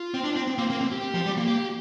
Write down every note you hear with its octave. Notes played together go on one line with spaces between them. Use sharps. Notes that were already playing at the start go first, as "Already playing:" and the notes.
Already playing: F4
C4
D4
C4
C4
A#3 C4
A#3 C4
C4
G4
F3
G3
A#3
G4